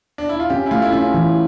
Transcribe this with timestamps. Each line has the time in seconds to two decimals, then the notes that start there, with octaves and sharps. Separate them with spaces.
0.18 D4
0.29 E4
0.40 F4
0.50 C#4 G4
0.66 E4
0.71 A3 F4
0.82 E4
0.92 C#4 F4
1.14 E3